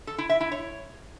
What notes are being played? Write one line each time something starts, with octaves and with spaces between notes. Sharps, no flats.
A4
E4
E5
E4
C#5